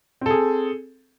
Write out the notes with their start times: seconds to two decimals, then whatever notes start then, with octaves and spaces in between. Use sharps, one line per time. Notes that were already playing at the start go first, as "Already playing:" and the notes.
0.21 C4
0.26 A4
0.30 G#4